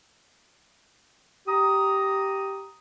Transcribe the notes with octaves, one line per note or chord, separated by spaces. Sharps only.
G4 A#5 D#6